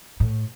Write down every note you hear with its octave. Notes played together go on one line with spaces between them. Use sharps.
A2